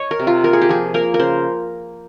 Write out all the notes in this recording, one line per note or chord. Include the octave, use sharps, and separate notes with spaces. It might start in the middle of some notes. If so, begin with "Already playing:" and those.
Already playing: C#5 D#5
A#4
C3
F4
A#3 A#4
G#4
G4
F3 G#4
A#3 A#4
A#4
C#3 C5